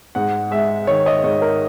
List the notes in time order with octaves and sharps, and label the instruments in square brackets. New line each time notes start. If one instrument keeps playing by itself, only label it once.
[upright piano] G#2 F#5
G#3 E5
D#3 C#5
D#5
G#2 C#5
A#4